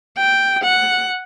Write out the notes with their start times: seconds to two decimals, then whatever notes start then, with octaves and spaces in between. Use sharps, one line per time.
0.18 G5
0.64 F#5